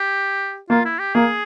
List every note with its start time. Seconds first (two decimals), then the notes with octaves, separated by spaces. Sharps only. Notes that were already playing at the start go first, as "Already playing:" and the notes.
Already playing: G4
0.70 A#3 F4
0.85 E4
0.99 G4
1.14 A#3 G#4